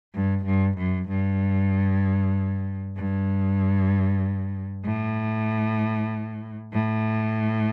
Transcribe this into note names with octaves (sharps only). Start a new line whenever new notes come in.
G2
G2
F#2
G2
G2
A2
A2